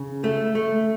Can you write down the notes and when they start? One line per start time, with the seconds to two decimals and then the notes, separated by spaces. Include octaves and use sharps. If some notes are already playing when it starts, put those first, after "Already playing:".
Already playing: C#3
0.24 A3
0.55 A3